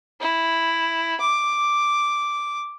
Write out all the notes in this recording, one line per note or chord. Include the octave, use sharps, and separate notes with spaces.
E4
D6